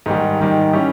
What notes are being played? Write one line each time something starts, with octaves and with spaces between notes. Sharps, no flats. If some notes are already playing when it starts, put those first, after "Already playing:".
G#2 D#3 G3
G#2 D#3 G3
G3 C#4 E4